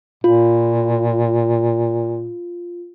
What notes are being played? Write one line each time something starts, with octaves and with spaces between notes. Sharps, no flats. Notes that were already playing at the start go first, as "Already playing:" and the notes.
A#2 F4